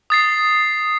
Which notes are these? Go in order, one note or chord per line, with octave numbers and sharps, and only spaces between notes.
D#6 A6 C7